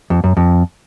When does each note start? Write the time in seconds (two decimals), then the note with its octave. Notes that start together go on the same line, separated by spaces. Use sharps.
0.10 F2
0.24 F#2
0.37 F2